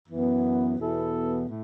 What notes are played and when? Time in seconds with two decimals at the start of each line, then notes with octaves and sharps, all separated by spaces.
0.08 F#2 E3 B3
0.78 E2 B2 B3 E4 A4
1.48 A2